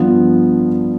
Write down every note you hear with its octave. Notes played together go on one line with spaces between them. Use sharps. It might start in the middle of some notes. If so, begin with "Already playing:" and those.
Already playing: G2 F3 B3 F4